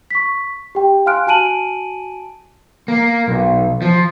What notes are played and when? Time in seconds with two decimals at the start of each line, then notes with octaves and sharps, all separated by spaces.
0.11 C#6 B6
0.75 G4 G5
1.06 F5 G#5 C6 F6 F#6 D7
1.27 F#4 G#5 A5 D7 D#7 F#7
2.88 A#3
3.28 B1
3.82 F3